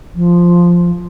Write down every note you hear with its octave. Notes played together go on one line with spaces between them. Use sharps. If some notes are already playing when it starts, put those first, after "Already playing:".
F3